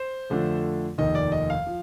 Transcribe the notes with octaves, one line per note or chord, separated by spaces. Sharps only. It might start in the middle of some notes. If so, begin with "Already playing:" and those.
Already playing: C5
F2 D3 A3 D4 F4
F1 D#2 D#3 D#5
D5
D#5
F5
F3